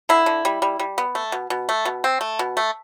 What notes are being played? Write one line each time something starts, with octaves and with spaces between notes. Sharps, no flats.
D3 E4
D3
G3
G3
G3
B3
A3
B2
B2
A3
B2
C4
A3
B2
A3